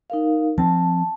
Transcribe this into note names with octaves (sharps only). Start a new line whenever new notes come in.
D#4 A#4 F5
F3 C4 A5